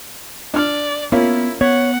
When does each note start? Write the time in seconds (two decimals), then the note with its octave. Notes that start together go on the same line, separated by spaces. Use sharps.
0.54 D4 D5 F6
1.12 A#3 B3 C#4 E4 F4
1.61 B3 C#5 F#5